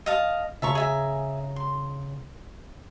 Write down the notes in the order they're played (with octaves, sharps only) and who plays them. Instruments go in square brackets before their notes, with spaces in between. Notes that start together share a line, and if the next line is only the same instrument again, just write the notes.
[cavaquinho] D#5 F5 A5
[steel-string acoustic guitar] C#3 A#5 [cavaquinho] E5 A5 C#6
[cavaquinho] G#4 E5 G#5
C6